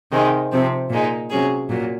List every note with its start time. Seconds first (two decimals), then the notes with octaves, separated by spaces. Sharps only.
0.12 C3 D#3 G#3 C4
0.52 C3 F3 C4
0.91 A#2 G#3 D#4
1.30 C3 F#3 C#4 G#4
1.69 A#2 F#3